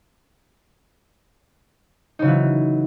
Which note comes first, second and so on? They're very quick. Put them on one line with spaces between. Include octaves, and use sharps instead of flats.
D#4 C#3 F#3 E3